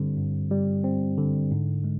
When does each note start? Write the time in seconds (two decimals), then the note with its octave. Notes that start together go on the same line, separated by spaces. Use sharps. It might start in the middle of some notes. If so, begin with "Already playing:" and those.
Already playing: G2 D3 G3 C4
0.18 G2
0.51 G3
0.84 C4
1.18 D3
1.51 G#2
1.84 G#3